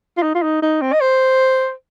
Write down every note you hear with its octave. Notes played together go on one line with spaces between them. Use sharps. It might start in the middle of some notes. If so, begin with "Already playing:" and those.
F4
D#4
F4
D#4
D#4
C4
D#5
C5